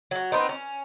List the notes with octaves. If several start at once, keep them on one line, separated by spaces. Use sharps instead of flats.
F#3 F#4
B3 C4 D#4
C#4